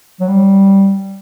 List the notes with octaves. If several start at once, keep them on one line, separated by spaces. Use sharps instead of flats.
F#3
G3